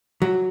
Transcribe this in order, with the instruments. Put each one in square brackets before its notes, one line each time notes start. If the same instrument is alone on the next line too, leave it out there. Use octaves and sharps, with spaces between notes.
[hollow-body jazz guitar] F#3